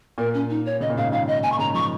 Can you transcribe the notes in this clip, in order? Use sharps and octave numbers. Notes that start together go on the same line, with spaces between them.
A#2 A#4
C#4
D#4
C#5
C#3 D#5
A#2
G#2 C#3 F5
A#2 D#3 F5
D#5
A#2 G#5
C#6
G#2 C#3 A#5
C#3 F3 C#6